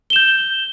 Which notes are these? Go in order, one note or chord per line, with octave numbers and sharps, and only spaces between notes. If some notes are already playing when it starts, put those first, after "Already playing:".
G6 E7 G7